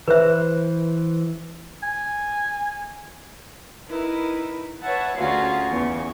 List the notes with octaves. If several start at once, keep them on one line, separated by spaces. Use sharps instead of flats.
E3 B4 C5 E5 F#6
G#5
D#4 E4 A#4 B4
B4 C#5 E5 F#5 A5
D2 C#4 F4 F#4 G#4 F5
E2 C#3 C#6